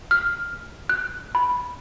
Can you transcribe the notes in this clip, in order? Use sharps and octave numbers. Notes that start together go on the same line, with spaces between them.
F6
F#6
B5